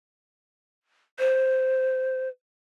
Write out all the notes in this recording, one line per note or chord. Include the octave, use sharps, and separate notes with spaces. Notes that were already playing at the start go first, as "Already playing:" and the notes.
C5